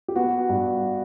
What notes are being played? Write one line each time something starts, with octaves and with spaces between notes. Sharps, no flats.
G4
B3 F#4
G2